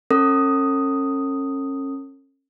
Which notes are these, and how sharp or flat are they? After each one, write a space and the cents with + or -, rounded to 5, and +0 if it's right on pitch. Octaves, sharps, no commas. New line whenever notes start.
C#4 -30 A4 +45 D#6 +0